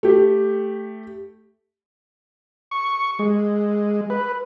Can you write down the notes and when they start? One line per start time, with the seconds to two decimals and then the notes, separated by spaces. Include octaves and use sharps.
0.03 A3 G4
2.71 C#6
3.19 G#3
4.10 B4